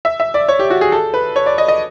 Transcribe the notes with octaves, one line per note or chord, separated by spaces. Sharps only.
E5
E5
D5
C#5
G4
F#4
G#4
A4
B4
C#5
D5
D#5
D#5